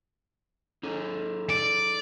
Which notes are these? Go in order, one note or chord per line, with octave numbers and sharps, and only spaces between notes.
D#4 G#4 A4
D5